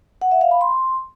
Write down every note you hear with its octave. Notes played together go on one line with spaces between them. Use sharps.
F#5
E5
F5
B5
C6